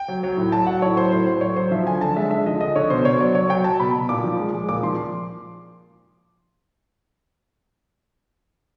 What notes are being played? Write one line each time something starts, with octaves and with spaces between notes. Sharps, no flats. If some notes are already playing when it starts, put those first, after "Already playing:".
Already playing: G5
F#3
F#3
A2
F#3 A5
F#3 F#5
A2 C#5
F#3 C5
A2 C5
F#3 C5
F#3 C#5
F#3 C5
F3 E5
D3 G#5
D3 A5
G#3 E5
D3 E5
F3 D#5
D3 D#5
D3 C#5
B2 C5
B2 C#5
F#3 D5
F#3 C#5
F#3 G5
F#3 A5
B2 B5
B2
A#2 D6
F3
G#3
G#3
A#2 D6
F3 C6